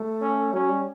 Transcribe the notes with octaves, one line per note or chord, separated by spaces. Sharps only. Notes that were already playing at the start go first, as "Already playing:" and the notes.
Already playing: A3
C#4
F#3 C#4
G3